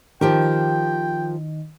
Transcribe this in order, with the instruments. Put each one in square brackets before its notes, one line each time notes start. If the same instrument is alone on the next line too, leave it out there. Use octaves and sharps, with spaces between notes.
[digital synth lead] D#3 [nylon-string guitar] F3 G4 A#4 [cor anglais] G5